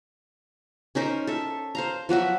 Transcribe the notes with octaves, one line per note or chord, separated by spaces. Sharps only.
C#4 D#4 A#4 C5
A4 E5
C5 F5 A#5
F3 F#3 F#4 E5